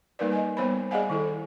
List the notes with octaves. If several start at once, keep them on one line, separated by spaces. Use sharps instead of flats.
G3 A#3 D#4 A#4 B4 D5
D#5 G#5
G3 B3 C5 C#5 B5
G#4 D5 D#5 F5 F#5 G#5
D#3 E4 A4